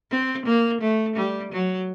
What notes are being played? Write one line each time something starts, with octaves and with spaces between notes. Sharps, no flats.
C4
A#3
A3
G3
F#3